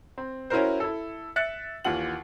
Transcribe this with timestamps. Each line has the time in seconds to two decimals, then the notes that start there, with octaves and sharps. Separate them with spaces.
0.18 C4
0.50 C#4 E4 F#4 A#4 C5
0.80 E4 A4
1.36 E5 F#6 A6 C#7
1.85 D#2 E3 F4 F#5 F#7